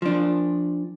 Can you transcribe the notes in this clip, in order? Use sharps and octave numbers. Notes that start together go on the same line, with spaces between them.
F3 D4